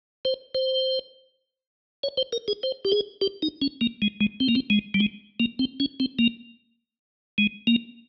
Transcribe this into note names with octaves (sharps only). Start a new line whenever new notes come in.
C5
C5
C#5
C5
A#4
G#4
C5
G4
G#4
G4
D#4
C#4
A#3
G#3
G#3
C4
A#3
C4
G#3
G3
G#3
A#3
C4
C#4
C4
A#3
G#3
A#3